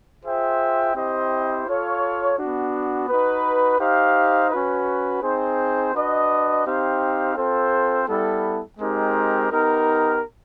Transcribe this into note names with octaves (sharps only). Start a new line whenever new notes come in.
F4 G#4 C5 E5 G5
C4 E4 G4 C5 D#5
F4 A4 C#5 F5
B3 D4 F#4
D#4 F#4 B4
D#4 G4 C5 F5
C#4 F#4 B4
C4 D#4 G#4 C5
D4 F#4 B4 D#5
C4 D#4 G4 C5 F5
C4 F4 A4 C5
G3 B3 E4 A4
G#3 C4 D#4 G4 A#4
B3 D#4 G4 A#4